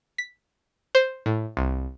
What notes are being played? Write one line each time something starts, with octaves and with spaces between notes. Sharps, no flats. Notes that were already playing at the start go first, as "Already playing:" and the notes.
B6
C5
A2
C2